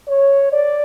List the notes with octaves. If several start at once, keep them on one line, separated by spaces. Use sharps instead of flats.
C#5
D5